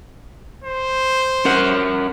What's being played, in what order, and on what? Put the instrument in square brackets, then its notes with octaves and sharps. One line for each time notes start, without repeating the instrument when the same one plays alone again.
[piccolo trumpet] C5
[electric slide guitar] C#4 A#4 F#5